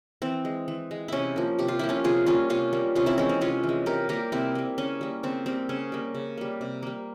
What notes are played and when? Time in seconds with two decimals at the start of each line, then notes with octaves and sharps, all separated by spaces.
0.22 E3 C4
0.45 G#3
0.68 E3
0.91 G#3
1.08 C3 C#4 E4
1.36 F3 A#3
1.59 C3 G4
1.68 F4
1.79 F3 A#3 E4
1.89 C#4 F4
2.04 C3 F4 G#4
2.26 G3 A#3 C#4 F4
2.49 C3 C#4 F4
2.73 G3 A#3
2.95 C3 C#4 F4
3.06 C4 E4
3.18 E3 G#3 C#4
3.29 C4
3.41 C3 C#4 F4
3.63 E3
3.69 G#3
3.86 C3 G4 A#4
4.09 G3 A#3 G4 A#4
4.32 C3 C4 E4
4.55 G3 A#3
4.78 C#3 C#4
5.01 G3 A#3
5.23 C#3 C4
5.46 G3 A#3 C4
5.69 C#3 C#4
5.92 G3 A#3
6.14 C#3
6.38 G3 A#3
6.61 C3
6.83 G3 A#3